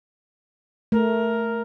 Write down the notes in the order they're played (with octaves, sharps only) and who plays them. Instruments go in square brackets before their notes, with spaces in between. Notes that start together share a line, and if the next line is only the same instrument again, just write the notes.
[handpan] A3 [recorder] A#4